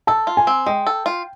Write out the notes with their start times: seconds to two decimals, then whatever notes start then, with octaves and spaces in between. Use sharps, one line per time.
0.07 A4 A5
0.27 F4
0.37 G#5
0.47 C4
0.66 G#3 G5
0.87 A4
1.06 F4